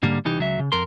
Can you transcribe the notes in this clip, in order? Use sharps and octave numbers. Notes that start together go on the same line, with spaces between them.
G#2 D3 G3 A#3
C2 E3 D#4 G4
C#2 F#3 E5
C#3
F2 A#4 C6